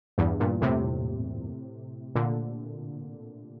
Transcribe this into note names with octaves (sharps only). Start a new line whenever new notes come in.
E2 G2
G2 A#2
A2 C3
A#2 D3